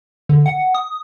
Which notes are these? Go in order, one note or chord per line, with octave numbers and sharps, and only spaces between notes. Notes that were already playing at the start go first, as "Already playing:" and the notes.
D3
F#5
D#6